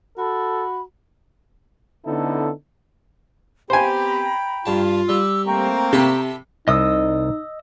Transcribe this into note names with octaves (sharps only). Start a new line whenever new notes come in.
F#4 A4 B5
D3 B3 C#4 D#4 E4 A4
B3 C4 G4 C5 G5 G#5 A#5 B5
G2 F4 A5
G3 D6 E6
A3 A#3 C4 G5 A#5 C#6
C3 E4 G4 A4
C2 D#4 D#5 D#6 E6